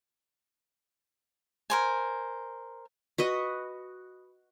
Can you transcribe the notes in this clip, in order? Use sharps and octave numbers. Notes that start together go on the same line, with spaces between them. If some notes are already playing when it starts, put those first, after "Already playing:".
A#4 C5 G#5
F#4 B4 D#5